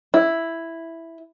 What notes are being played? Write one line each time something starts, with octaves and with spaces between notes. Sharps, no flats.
E4